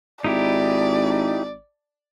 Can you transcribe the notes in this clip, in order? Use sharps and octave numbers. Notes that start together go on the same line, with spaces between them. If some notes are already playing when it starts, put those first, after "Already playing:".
G#1 D#4 E4 G4 D5